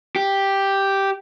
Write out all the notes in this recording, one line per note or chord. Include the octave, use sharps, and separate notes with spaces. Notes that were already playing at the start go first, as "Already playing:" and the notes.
G4